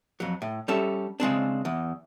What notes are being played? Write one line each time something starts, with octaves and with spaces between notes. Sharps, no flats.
F2 F#3
A2
G3 C#4 A4 E5
C#3 G#3 C4 D4
E2